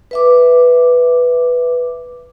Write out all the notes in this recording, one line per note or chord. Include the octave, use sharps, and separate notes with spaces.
B4 E5 D6